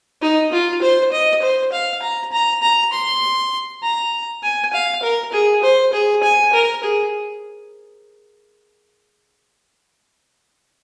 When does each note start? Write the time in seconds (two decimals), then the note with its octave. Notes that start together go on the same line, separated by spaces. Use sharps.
0.22 D#4
0.52 F4
0.82 C5
1.12 D#5
1.42 C5
1.72 F5
2.02 A#5
2.32 A#5
2.62 A#5
2.93 C6
3.83 A#5
4.43 G#5
4.73 F5
5.03 A#4
5.33 G#4
5.63 C5
5.93 G#4
6.23 G#5
6.53 A#4
6.83 G#4